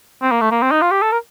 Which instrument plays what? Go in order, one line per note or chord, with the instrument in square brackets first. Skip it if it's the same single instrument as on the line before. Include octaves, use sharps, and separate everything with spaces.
[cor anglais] C4
A#3
A3
A#3
C4
D#4
F4
G4
A4
A#4